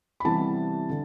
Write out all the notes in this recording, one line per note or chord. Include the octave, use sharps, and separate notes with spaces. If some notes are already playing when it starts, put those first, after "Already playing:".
B5
C3 E3 G3 B3 E4 A5
D3